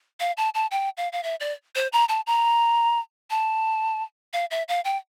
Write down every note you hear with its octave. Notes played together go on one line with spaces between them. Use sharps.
F5
A5
A5
G5
F5
F5
E5
D5
C5
A#5
A5
A#5
A5
F5
E5
F5
G5